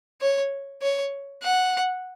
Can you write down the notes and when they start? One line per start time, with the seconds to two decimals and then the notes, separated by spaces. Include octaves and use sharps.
0.21 C#5
0.82 C#5
1.43 F#5